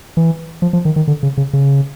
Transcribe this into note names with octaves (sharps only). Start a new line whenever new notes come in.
E3
F3
F3
D#3
D#3
D3
C#3
C#3
C#3